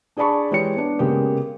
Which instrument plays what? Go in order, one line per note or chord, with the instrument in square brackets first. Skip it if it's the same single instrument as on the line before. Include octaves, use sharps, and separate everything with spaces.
[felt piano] D4 G#4 D5 A5 B5 C#6
E3 G#3 G4 C#5 C#7
B3 D4
C#3 G#3 A#3 B3 G4